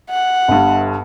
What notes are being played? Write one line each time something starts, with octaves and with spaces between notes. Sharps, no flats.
F#5
G1 G2